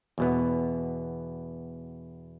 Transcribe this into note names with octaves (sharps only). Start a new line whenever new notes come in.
E2 B2 B3